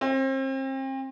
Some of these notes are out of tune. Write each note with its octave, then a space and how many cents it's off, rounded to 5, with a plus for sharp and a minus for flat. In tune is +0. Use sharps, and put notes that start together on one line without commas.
C4 +35